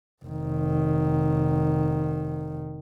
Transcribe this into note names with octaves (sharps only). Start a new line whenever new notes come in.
F1 D#3